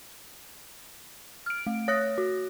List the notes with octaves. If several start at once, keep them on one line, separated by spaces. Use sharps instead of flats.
F6 D7
A3
C#5 D#6 F#6 A#6
F#4